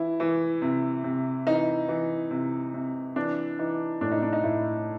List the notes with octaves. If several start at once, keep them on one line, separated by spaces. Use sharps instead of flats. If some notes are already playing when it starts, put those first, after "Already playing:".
Already playing: E3 E4
E3
C3
C3
E3 D#4
E3
C3
C3
E3 D4
E3 D#4
A2 D4
D#4
D4
D#4
A2 E4